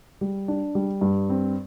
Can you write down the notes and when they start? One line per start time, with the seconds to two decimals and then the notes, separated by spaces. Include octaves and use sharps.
0.21 G3
0.48 D4
0.75 G3
1.01 G2
1.30 C4